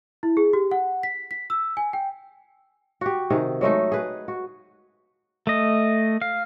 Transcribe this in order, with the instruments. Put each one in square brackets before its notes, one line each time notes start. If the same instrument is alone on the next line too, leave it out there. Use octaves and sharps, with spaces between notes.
[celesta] E4
G#4
G4
F#5
B6
B6
E6
G#5
G5
[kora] F#4 G4
C3 D#3 G#4
F#3 G#3 A3 D#4
G#4 B4
F#4
[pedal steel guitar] A3 D#5
F5